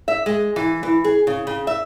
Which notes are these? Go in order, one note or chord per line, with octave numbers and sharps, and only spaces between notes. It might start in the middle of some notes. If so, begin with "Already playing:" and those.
E5
G#3
E3
E3
G#4
C#3
C#3
E5